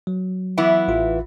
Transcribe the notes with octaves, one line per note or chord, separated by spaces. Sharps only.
F#3
E3 B3 E4
A1 F4